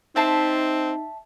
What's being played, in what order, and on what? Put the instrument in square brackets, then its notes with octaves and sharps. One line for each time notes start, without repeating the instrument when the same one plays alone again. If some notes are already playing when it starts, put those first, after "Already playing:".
[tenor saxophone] C4 [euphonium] D#4 [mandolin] E5 A5 C6